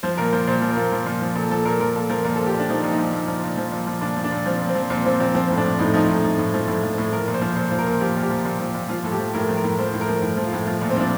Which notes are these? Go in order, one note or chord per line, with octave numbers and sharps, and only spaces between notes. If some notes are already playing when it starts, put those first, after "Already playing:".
F3 C5
A#2 A#4
F3 C5
A#2 C5
F3
A#4
A#2
F3
A#2
F3
A#2 A4
F3 A4
A#2 A#4
F3 A#4
A#2 A4
F3 A#4
A#2 A#4
A4
F3
G4
A#2
D4
F3 D#4
A#2
D#4
F3
A#2
F3
A#2
F3
A#2
F3
A#2 D4
F3
D4
A#2
F3 C4
A#2
C4
F3
A#2 C4
F3 C4
A#2 C4
F3 C4
A2
D4
F3
A2 D#4
F3 D#4
A2 D#4
F3
A2
F3
A2
F3
A2
F3 A#4
A#2
C5
F3
A#2 C5
F3
A#4
A#2
F3 G4
A#2
G4
F3
A#2
F3
A#2
F3 F4
A2 A4
G4
F3
A2 A#4
F3
A#4
A2
F3 C5
A2
A#4
F3
A2
F3
F4
A2
F3 F4
A#2
C4
F3 D4